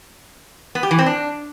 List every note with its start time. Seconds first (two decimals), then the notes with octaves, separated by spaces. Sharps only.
0.75 B3
0.83 G4
0.91 E3
0.99 C4
1.06 D4